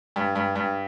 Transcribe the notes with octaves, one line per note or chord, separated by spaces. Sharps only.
G2
G2
G2